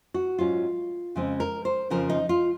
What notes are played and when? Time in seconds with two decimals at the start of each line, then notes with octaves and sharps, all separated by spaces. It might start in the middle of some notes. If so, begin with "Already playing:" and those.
0.14 F#4
0.38 G#2 F#3 C#4 F4
1.15 F2 C#3 G#3 C4
1.40 A#4
1.65 C5
1.90 F2 C#3 F3 C4 A#4
2.09 D#4
2.29 F4